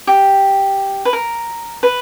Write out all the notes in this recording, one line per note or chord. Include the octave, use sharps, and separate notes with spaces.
G4
B4
A#4
B4